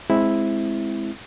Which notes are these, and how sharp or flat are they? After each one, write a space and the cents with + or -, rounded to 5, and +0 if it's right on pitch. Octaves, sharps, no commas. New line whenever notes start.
G#3 +0 C4 +0 E4 +0